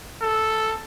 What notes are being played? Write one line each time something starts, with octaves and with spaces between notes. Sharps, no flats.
A4